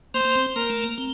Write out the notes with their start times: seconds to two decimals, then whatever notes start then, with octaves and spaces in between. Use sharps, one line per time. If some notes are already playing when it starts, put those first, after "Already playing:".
0.14 A#3 C5
0.25 A#3
0.36 C4
0.56 A#3 A#4
0.70 A3
0.84 A#3
0.98 C4